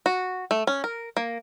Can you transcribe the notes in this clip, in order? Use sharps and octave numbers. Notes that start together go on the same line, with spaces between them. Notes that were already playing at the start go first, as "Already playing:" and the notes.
F#4
A3
C#4
A#4
A#3